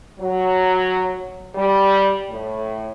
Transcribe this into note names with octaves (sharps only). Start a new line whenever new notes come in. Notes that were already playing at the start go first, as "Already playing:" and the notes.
F#3
G3
A2